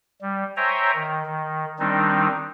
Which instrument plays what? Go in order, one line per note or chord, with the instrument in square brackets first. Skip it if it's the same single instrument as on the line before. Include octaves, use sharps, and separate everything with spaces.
[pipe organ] G3
C5 C#5 E5 G5 G#5 A#5
D#3
D#3
D#3 G3 C4 D4 D#4